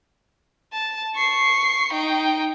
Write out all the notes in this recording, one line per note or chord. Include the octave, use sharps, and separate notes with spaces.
A5
C#6 C7
D#4 G5